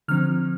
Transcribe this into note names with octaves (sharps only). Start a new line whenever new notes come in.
D3 F3 C4 F6